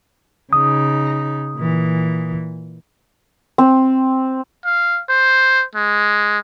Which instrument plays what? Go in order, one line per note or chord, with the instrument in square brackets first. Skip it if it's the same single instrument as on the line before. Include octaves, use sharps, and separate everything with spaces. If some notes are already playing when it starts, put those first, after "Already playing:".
[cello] C#3 D#4 [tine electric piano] D#6
[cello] A#2 E3
[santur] C4
[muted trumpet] F5
C5
G#3